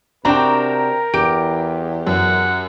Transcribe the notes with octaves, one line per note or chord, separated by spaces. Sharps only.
C3 C4 D4 F#4 A#4 G5 A#5
E2 G4 D7
F#2 F#5